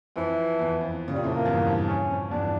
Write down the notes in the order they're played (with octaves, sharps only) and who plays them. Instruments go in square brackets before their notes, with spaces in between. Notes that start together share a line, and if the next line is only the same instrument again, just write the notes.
[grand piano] F2 [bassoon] E3
[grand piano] E2
F2
C#3
[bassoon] G3
[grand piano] A#2
[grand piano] F2 A2 [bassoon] A3
[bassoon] A#3
[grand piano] E2 G2
F2
[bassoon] C#4
[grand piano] F2
[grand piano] E2 G2 [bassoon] D4